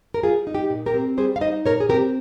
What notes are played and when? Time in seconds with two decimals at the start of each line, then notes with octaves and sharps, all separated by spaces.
0.14 A#4
0.23 G3 F4 G#4
0.47 D#4
0.55 G4
0.70 A#2
0.86 G4 A#4
0.94 C4
1.17 G3 G#4 C5
1.36 F5
1.41 D#4 C5 D#5
1.65 A#2 A#4 C#5
1.80 G#4
1.89 C4 G4 A#4